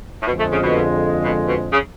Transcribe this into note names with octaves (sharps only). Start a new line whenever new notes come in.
A2
F2 B2 D3 F3 G#3
A3
C#3
B2
B2
B2
C#3